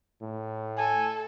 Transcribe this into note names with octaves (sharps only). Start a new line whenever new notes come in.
A2
A4 G#5